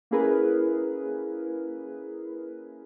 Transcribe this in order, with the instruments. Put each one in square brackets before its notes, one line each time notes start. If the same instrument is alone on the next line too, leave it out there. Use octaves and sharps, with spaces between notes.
[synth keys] A#3 C#4 E4 G#4 A#4 B4